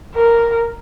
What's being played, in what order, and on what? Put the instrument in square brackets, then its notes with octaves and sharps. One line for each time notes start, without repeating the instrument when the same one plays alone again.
[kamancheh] A#4